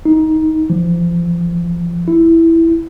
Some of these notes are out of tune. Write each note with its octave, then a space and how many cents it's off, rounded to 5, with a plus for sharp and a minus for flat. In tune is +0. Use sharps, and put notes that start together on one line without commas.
D#4 +15
F3 -30
E4 +0